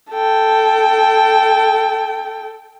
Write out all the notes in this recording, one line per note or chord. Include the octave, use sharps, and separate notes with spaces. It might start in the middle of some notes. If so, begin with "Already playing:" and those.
A4 G5